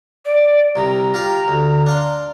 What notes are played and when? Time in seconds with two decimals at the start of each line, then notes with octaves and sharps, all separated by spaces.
0.25 D5
0.76 C2 C3 A#5
1.14 F4 G4 F5
1.48 D2
1.86 D4 F5 C6